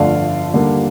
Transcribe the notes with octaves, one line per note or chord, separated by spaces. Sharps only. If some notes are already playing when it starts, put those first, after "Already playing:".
Already playing: G1 F2 D3 F3 A3 D5 F5
D#2 D3 G3 A#3